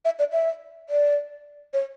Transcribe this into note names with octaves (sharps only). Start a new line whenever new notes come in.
E5
D5
E5
D5
C#5